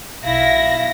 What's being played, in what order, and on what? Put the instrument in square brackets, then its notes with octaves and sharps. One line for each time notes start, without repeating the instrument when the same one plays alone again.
[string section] B1 A#6 [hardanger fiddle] E4 [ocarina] F5